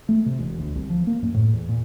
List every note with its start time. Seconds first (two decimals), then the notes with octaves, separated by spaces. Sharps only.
0.09 A3
0.26 C3
0.39 E1
0.59 D2
0.75 C2
0.90 F3
1.07 A#3
1.22 F#2
1.34 A2
1.53 E2
1.69 A#2